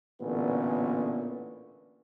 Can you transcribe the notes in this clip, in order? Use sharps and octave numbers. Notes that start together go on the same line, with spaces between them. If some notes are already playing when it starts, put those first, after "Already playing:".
A1 A#2 D3 B3 C#4